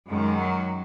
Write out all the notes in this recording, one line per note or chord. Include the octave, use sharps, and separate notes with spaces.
F#2 D#3 G#3
F#3